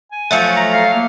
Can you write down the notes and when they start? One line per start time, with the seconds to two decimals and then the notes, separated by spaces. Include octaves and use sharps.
0.12 G#5
0.31 F3 F#3 A3
0.56 A#5
0.73 F5
0.94 A#3